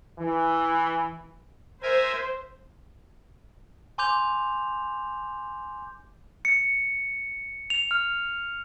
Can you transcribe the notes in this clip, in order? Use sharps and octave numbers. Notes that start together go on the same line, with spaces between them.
E3
A#4 C5 E5 G#5
G#5 C6 D6 G6 F7
C#7
F7
F6